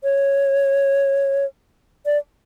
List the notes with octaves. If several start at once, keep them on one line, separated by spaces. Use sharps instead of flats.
C#5
D5